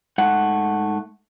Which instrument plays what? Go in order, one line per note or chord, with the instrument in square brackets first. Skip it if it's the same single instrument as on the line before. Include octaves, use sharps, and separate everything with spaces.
[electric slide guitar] G#2 A3 F#5